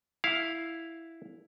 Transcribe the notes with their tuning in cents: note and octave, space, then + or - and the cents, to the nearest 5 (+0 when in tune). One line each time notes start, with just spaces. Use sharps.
E4 +0 F5 +0